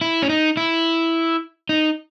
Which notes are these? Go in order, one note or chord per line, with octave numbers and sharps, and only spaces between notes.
E4
C#4
D#4
E4
D#4